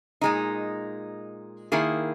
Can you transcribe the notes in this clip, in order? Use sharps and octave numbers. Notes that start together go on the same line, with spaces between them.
A#2 G#3 D#4
D#3 A#3 E4 G#4